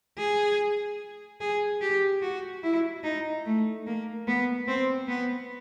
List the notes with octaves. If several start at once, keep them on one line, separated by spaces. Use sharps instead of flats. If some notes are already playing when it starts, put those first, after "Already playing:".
G#4
G#4
G4
F#4
E4
D#4
A3
A#3
B3
C4
B3